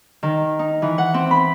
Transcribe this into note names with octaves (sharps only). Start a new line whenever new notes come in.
D#3
D#4
E3
F#5
C4
B5